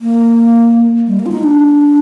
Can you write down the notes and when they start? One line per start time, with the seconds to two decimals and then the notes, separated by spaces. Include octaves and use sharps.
0.01 A#3
1.07 G3
1.19 A#3
1.26 F4
1.31 D#4
1.43 D4